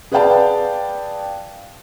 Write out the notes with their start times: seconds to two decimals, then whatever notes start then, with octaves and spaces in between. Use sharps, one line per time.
0.12 G#4 B4 D5 F5 G5 A5